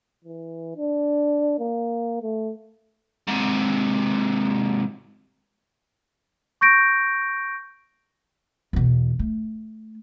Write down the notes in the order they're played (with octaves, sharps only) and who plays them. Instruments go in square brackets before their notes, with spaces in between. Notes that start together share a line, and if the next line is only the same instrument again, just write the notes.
[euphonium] E3
D4
A#3
A3
[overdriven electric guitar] G#2 C3
[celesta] C#6 G6 A#6 D7
[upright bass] E2 B2
A3